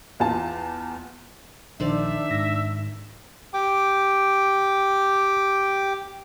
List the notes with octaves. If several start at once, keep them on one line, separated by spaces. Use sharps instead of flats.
E2 F4 A5
A#1 D#3 D4 C5 D5 E5
G#2 A#6
G4 G5 D6